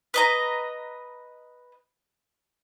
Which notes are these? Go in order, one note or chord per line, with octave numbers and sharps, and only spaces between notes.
B4 D#5 A#5